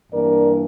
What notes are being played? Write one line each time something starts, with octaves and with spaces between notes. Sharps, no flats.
G2 E3 A#3 D4 A#4 D5